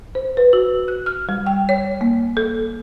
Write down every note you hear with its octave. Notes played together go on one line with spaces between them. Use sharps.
C5
B4
F#4
F#6
F6
G3
G5
C#5
A#3
A4